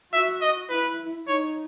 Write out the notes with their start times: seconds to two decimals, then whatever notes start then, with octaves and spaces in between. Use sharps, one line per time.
0.13 F#4 E5
0.41 D#5
0.70 E4 B4
1.27 D#4 C#5